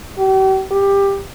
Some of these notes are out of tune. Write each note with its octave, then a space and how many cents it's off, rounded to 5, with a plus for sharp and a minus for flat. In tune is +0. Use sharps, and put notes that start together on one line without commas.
G4 -45
G4 +15